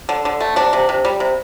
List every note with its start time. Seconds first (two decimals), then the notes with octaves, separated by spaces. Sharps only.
0.09 D3
0.25 D3
0.40 A3
0.56 C3 D4
0.73 C3
0.89 C3
1.05 G3
1.20 C3